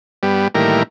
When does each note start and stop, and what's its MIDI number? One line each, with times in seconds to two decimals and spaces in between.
0.23 0.48 43
0.23 0.48 55
0.23 0.48 59
0.55 0.83 45
0.55 0.83 51
0.55 0.83 52
0.55 0.83 55
0.55 0.83 58
0.55 0.83 70